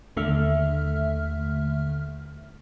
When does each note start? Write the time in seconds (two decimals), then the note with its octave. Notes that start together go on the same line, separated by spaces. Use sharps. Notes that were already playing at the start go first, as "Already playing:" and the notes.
0.17 D#2 D3 A3 E5 F6